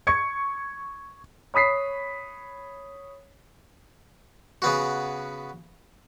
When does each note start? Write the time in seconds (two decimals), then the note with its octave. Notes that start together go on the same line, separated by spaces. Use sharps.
0.07 C#6 G#6 C#7
1.54 C#5 B5 D#6 B6 C7
4.62 C#3 B3 F#4